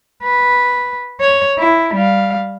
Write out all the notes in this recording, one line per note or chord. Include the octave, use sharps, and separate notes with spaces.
B4
C#5
E4
G3 F5